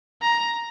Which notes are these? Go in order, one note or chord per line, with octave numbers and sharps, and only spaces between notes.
A#5